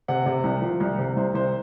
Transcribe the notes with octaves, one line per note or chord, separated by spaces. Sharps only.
C3 F#5
C3
C2
F3
C2
C3
C2 C5
C2 C5